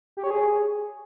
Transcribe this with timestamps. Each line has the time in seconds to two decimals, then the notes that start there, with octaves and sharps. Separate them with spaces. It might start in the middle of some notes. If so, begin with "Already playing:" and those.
0.17 G4
0.24 C#5
0.30 G#4